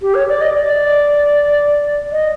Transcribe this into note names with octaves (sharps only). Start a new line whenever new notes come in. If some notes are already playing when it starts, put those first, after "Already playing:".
G4
C#5
D5
D#5
D5
D#5